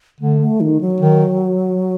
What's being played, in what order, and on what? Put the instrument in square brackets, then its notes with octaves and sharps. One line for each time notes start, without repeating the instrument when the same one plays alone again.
[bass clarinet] D3 [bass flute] A3
[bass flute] A3
D#3
F#3
[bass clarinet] D#3